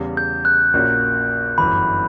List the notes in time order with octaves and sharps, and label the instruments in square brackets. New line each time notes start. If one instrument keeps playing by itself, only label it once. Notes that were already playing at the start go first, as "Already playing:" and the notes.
Already playing: [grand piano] E2 C#3 G3
[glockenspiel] G6
F#6
[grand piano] A#1 A#2 A#3 C#4 F#4
[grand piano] G1 F#2 E3 [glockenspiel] B5